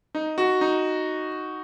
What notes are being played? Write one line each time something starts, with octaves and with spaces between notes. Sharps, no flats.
D#4
F#4
D#4